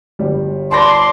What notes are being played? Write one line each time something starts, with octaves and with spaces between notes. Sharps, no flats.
G1 G3
D5 A5 B5 C6 A#6